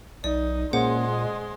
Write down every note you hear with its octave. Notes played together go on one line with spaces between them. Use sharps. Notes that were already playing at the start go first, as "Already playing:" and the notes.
B1 D#4 D5
A#2 G#3 A#3 C#4 G#4 C5 F#5 C6
D#5